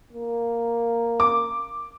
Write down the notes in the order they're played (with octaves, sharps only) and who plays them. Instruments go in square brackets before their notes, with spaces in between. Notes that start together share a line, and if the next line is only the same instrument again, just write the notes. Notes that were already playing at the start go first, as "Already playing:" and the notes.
[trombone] A#3
[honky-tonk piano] D6